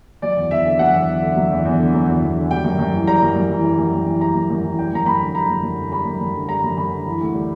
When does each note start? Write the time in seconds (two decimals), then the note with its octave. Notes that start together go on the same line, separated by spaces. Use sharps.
0.22 F#3 D5
0.37 E2
0.51 E2 E5
0.65 D3
0.79 F#3 F#5
0.93 E2
1.08 E2
1.22 D3
1.37 F#3
1.51 E2
1.65 E2
1.79 D3
1.94 F#3
2.07 E2
2.22 E2
2.36 D3
2.51 G3 G5
2.64 F#2
2.79 F#2
2.93 E3
3.07 G3 A#5
3.22 F#2
3.36 F#2
3.50 E3
3.64 G3
3.78 F#2
3.92 F#2
4.06 E3
4.21 G3 A#5
4.35 F#2
4.50 F#2
4.64 E3
4.78 G3 G5
4.93 F#2 A#5
5.06 F#2 B5
5.21 D3
5.35 G3 A#5
5.50 F#2
5.63 F#2
5.78 D3
5.92 G3 B5
6.06 F#2
6.21 F#2
6.35 D3
6.49 G3 A#5
6.64 F#2
6.77 F#2 B5
6.92 D3
7.06 E3
7.21 D2
7.34 G3